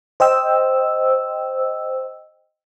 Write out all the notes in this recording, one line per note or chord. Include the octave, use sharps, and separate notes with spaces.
C5 D#5 G5 E6